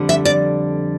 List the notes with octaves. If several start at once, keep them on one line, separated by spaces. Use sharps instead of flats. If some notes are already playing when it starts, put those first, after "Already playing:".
Already playing: F2 D3 G3
E5
D5